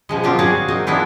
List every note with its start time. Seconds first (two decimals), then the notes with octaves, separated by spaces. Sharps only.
0.09 B2 F3 G#3
0.24 F#3 C4 F4 G4 A#4
0.39 F#4 G#4 D5 F5 F#5
0.68 F#3 A#3 C4 D#4
0.87 E3 B3 D4 E4 F4